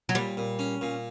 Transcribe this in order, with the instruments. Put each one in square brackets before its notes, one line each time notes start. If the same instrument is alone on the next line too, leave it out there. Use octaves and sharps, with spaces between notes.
[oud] F#3
[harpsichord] A#2 [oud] G3
[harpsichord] A#2
C#4
A#2